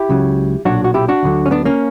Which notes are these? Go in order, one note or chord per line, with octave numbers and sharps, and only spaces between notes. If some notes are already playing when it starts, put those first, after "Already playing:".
Already playing: E4 G4
C#2 C#3 F#3
B1 A#2 F#3 D4 F#4
F#4
E4 G4
D4 F#4
D2 D3 F#3
C#4
B3 D4
A#3 C#4